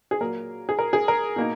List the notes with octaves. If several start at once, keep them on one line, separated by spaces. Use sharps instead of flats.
G#4
A#2 F#3 A#3 A#4
G#4
A#4
G#4
A#4
B2 A#3 D#4